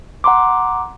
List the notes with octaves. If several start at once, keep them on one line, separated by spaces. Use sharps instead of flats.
F#5 A#5 C6 D6